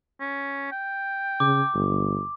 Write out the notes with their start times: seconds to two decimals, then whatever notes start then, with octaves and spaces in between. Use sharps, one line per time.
0.20 C#4
0.71 G5
1.40 C#3 D6
1.73 G1